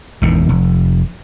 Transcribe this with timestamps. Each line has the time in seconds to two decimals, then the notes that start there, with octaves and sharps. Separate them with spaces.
0.22 G#1 E2 B2 D#3
0.49 F1